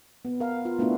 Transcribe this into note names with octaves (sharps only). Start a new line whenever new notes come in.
B3
A#4 F5
F4
A3 B3 D4 E4 F#4